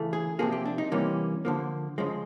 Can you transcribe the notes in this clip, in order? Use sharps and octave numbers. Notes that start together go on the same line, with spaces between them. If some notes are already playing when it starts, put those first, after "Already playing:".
Already playing: C#3 E3 A3
G#4
C3 F3 A#3 G#4
G4
D4
D#4
C3 E3 G3 A#3 C#4
D3 F3 A#3
C#3 F3 G#3